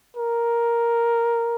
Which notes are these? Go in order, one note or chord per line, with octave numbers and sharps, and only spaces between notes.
A#4